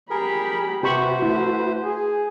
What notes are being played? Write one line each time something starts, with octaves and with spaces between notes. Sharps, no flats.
G4 G#4 A#4 B5
C3 F#4 G4 B4 C5 B5 C#6
A3 E4
G#4